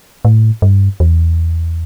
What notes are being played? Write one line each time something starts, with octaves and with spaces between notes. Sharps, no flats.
A2
G2
E2